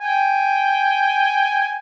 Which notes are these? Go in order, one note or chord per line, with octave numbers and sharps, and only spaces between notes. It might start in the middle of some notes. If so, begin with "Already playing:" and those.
G5 G#5